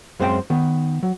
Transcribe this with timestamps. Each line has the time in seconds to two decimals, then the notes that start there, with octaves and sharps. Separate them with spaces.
0.20 F#2 G#3 C4 C5 F5 G5
0.50 D#3 B3
1.03 F#3